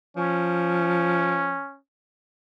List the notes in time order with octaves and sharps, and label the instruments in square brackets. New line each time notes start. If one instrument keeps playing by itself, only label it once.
[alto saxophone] F3 [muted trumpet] C#4